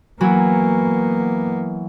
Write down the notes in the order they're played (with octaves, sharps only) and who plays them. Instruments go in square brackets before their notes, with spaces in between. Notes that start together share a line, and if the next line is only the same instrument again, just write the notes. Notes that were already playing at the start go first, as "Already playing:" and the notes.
[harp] E3 F#3 E4 [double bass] A#3 B3